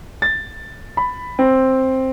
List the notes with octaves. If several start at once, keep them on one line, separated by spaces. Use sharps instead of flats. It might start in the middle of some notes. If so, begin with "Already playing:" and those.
A6
B5
C4